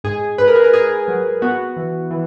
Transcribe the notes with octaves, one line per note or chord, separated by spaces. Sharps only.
G#2 G#4
G#2 B4
A#4
G#4
A#4
G#2 G#4
F#3
B3 F#4
E3
E3